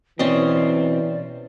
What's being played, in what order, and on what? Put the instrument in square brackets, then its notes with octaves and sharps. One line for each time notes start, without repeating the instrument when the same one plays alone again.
[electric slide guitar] B2 C4 [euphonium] E3 [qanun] C#4 D#5 [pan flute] D5